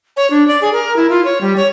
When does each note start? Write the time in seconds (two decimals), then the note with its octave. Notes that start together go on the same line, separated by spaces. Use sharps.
0.17 C#5
0.30 D4
0.48 D5
0.62 G#4
0.73 A#4
0.96 E4
1.10 F4
1.25 C#5
1.41 G3
1.57 C#5